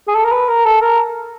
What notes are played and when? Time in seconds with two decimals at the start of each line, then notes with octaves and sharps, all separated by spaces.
0.08 G#4
0.15 A4
0.24 A#4
0.32 B4
0.49 A#4
0.65 A4
0.81 A#4